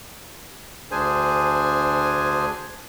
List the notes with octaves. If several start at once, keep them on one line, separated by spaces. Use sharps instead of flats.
D2 D4 G#4 C5 G#5